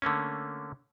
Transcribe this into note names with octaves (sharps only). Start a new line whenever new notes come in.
D3 A3 A#3 C#4